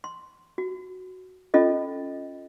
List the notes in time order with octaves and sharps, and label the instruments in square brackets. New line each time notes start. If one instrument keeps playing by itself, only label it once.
[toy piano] C6
F#4
C#4 F4 A4 D#5